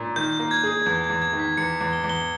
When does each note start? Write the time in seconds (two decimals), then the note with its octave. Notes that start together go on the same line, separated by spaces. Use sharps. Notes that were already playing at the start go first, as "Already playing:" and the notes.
Already playing: A#2
0.16 D#3 G6
0.39 A#3
0.51 G#6
0.63 G#4
0.86 E2 G6
1.04 G#6
1.10 E2
1.22 G#6
1.33 D#3
1.39 B6
1.57 E2 C#7
1.81 E2
1.93 G7
2.04 E2
2.09 G7